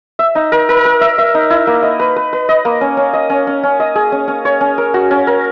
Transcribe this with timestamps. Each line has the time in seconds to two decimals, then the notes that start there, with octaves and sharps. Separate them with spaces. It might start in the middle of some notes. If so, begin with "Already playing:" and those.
0.19 E5
0.35 D#4
0.52 A#4
0.69 A#4
0.85 A#4
1.01 E5
1.18 E5
1.34 D#4
1.50 E4
1.67 A#3
1.83 D#5
1.99 B4
2.16 B4
2.33 B4
2.49 D#5
2.65 A#3
2.81 C#4
2.97 C#4
3.13 D#5
3.30 C#4
3.47 C#4
3.63 C#4
3.80 D#5
3.95 G#4
4.12 C#4
4.28 C#4
4.45 C#5
4.61 C#4
4.78 A#4
4.94 F#4
5.11 C#4
5.27 A#4